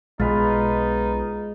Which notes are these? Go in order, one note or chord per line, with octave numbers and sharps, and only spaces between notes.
B1 B2 G#3 B3 D#4 F4 B4